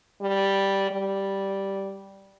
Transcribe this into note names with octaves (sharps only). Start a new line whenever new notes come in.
G3
G3